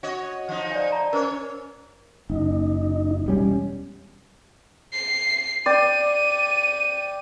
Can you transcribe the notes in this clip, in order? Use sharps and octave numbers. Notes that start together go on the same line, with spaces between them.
F#4 C#5 D#5
F3 D#4
D5 G#5
D5 A5 A#5
C#4 A#4 C5 C#5
F#1 D#4
E1 G3 C#4
C7
D5 G5 D#7